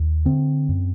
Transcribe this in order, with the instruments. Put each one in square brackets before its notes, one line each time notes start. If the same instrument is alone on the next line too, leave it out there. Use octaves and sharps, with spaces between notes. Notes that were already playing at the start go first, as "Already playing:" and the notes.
Already playing: [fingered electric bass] D#2
D3 C4
F#2